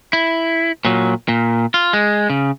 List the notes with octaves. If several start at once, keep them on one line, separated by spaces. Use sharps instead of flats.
E4
A#2 F#3
A#2
F4
G#3
C#3